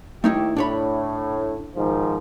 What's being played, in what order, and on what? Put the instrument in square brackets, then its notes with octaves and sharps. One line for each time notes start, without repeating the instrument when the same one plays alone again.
[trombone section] D#2 G4 [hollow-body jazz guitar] A3 D#4 E4
[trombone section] A2 [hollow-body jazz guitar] D4 C#5 B5
[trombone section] G#2 D#3 F3